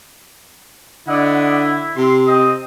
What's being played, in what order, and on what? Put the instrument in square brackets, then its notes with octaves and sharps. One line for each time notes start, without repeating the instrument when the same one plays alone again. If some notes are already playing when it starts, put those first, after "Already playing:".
[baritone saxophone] D3 [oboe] E4 [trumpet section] D5 D#5 F#5
[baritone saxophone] C3 [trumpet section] C6
[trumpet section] C4 D#5 D#6